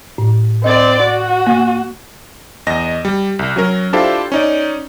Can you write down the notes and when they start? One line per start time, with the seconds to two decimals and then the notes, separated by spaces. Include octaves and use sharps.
0.18 A2
0.64 C4 D5 D#5
1.03 F#4
1.47 A#3
2.67 E2 D#5 A#6
3.05 G3
3.39 C2
3.56 F#3 C#4 A#4
3.93 D4 E4 F4 G4 A4 C5
4.32 C#4 D#4 D5